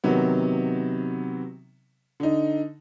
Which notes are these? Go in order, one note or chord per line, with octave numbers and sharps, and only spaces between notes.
C3 D#3 F#3 B3
D3 D#4